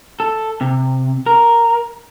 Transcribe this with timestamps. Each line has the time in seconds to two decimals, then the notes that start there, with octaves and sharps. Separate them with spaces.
0.20 A4
0.61 C3
1.26 A#4